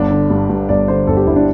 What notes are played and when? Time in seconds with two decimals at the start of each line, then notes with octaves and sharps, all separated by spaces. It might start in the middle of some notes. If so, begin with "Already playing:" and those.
Already playing: G1 D4
0.11 D3
0.30 G2
0.49 G2
0.69 G1 D5
0.88 D3 C5
1.07 G1 A4
1.17 G4
1.27 G1 E4
1.36 D4